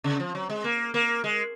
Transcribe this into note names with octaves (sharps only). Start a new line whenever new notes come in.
C#3
F3
F#3
G#3
A#3
A#3
G#3